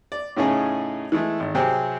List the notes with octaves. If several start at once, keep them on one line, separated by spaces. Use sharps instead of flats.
D5
A2 C#3 A3 C#4 D#4 G#4
E3 G#3 A3
G#1
C3 F#3 C4 G4 G#4